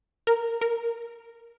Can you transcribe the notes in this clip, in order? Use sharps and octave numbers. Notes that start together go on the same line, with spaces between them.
A#4
A#4